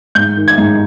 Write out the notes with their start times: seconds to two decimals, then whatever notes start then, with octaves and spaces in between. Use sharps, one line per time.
0.15 G#2 G6
0.37 D#3
0.48 G#6
0.58 G#2